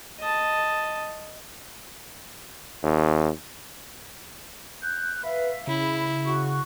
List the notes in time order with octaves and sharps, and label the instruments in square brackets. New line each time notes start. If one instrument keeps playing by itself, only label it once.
[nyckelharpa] D#5 A5
[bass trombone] D#2
[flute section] F#6 G6
[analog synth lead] B4 [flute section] E5 F5
[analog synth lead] C#3 [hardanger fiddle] E4 [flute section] B5
[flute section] F#4 C#6